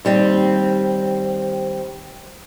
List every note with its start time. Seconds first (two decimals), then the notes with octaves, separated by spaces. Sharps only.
0.05 D#2 G3 C4